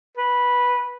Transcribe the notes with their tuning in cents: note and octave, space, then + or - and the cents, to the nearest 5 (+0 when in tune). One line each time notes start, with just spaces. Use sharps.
B4 -10